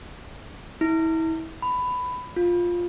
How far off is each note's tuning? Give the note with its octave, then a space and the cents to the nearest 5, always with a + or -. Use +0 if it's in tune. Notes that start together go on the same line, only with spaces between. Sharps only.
E4 -30
B5 +15
F4 +5